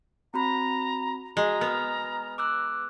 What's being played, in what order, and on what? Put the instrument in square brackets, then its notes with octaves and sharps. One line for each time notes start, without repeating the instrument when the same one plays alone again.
[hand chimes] C4 F#4 B5 [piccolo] A#5
[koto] G#3 [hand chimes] F#4 [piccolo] A#5
[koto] B3 [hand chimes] F6
[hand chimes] D6 E6 F#6